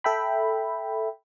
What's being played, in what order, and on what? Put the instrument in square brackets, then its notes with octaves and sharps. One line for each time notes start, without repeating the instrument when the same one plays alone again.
[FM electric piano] A4 E5 G5 B5